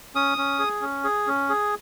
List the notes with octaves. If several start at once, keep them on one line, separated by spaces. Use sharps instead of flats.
C#4 D#6
C#4
G#4
C#4
G#4
C#4
G#4